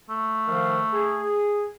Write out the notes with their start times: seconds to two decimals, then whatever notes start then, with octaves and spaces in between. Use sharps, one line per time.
0.10 A3
0.47 D#3 F3 F5
0.93 G#4